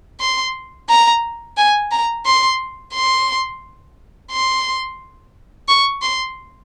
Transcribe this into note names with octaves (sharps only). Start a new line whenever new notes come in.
C6
A#5
G#5
A#5
C6
C6
C6
C#6
C6